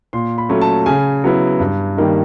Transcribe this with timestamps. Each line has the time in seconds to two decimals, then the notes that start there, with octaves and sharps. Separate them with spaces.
0.13 A#2 C6
0.38 B5
0.49 F#3 A3 C#4
0.61 A5
0.86 C#3 G#5
1.24 F#3 B3 E4
1.60 G2
1.97 D#3 G3 A#3 D#4